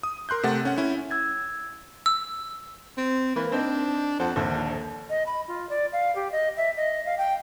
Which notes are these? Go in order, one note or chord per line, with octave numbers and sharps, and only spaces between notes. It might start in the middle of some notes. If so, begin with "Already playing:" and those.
D#6
A#4 C6 F#6 G6
C3 A3 F#5 A6
C#4 F#5
C#4 E4
E6 G#6 A6
E6
C4
E3 A#3 B4
C4 D4 D#4 C5
F2 C5 F#5 A5
A#1 D#2 D3 C5
D#5
B5
F4
D5
F5
G4
D#5
E5
D#5
F5
G5